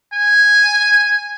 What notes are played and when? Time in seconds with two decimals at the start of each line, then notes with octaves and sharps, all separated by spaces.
0.13 G#5